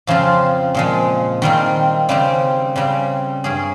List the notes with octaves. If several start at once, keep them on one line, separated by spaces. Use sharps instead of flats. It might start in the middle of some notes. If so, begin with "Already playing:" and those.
F2 C#3 F3 C4 F4
A#2 F3 G#3
D#3 G3 C4 F4
C#3 G3 C4 G4
C#3 G3 C4
G2 G3 C#4 G#4